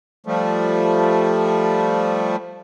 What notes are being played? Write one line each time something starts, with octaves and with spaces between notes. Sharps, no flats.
F3 G3 A3